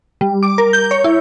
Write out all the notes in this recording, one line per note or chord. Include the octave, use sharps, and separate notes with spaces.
G3
D6
A#4
G6
C#5
E4